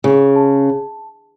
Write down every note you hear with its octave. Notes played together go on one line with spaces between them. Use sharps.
C#3 G#4
A5